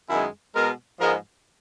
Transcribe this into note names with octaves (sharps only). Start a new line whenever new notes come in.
F#2 D#3 G#3 B3 E4
B2 G#3 B3 A#4
G#2 F3 G#3 B3 A#4